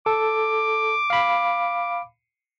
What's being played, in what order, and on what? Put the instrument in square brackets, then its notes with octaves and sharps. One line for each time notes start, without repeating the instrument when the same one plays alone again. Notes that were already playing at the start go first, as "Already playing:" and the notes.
[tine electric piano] A4 [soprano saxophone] D6
[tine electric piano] F5 B5